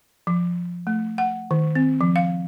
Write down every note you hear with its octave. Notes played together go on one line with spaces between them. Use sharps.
F3
A3
F#5
D#3
C4
F3
F5